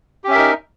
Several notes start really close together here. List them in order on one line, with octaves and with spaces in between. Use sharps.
G4 C#4 E5 A#4 D#4